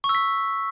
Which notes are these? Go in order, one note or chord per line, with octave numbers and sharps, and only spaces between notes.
C#6
E6
B6